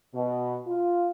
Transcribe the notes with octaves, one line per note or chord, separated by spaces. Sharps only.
B2
F4